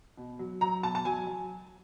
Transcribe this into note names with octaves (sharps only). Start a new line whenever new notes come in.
B2
F#3
F#3 A#5
B2 A5
A5
F#3 G#5
F#3